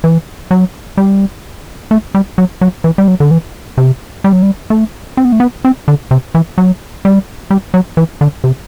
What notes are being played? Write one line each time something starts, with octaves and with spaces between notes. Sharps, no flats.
E3
F#3
G3
A3
G3
F#3
F#3
E3
G3
F#3
D3
E3
C3
G3
F#3
G3
A3
C4
B3
A3
B3
C4
D3
C3
E3
F#3
G3
G3
F#3
E3
D3
C3